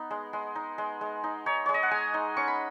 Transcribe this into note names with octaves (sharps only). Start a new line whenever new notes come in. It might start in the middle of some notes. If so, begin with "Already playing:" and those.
Already playing: B3 D#4
G#3
G#3
D#4
G#3
G#3
D#4
D#4 C#5
G#3 C#5
D#5
F#5
G#3 G#5
D#4
C#4 C#6
B5